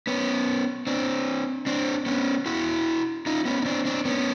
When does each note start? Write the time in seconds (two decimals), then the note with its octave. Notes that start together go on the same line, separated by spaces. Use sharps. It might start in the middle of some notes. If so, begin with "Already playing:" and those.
0.07 B3 C#4
0.87 C4 D4
1.66 C4 D4
2.06 B3 C#4
2.46 E4 F#4
3.26 D#4 F4
3.45 B3 C#4
3.62 D#4
3.65 C4 D4
3.85 C4 D4
4.05 B3 C#4